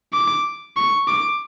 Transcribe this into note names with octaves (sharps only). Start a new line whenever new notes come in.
D6
C#6
D6